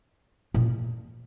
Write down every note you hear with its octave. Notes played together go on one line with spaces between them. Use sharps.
A#2